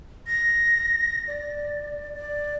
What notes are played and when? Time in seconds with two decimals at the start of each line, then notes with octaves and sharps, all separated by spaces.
0.27 A#6
1.28 D5
2.14 D5